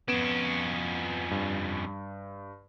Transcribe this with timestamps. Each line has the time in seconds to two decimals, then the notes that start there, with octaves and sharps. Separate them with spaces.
0.08 F2 B3 C#4 D7 E7
1.31 G2